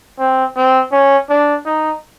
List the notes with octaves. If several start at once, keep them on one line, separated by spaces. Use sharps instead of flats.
C4
C4
C#4
D4
D#4